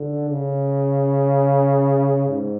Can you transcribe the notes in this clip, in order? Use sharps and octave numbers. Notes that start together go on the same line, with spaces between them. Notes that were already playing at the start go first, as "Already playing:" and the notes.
Already playing: D3
C#3
G#2